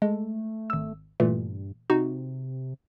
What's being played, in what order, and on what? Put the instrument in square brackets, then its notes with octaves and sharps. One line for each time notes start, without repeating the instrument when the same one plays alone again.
[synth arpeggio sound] G#3 [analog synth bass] A3
[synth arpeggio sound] G#1 E6
[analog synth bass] G2 [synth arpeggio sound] A#2 E3 A3
[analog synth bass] C3 [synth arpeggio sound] D#4 F#4